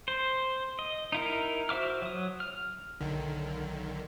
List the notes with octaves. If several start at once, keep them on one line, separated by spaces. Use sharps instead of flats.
C5
D#5
D#4 E4 A#4
F#4 C5 E5 D6 F6
F#3 D#6
F6
B1 D3 D#3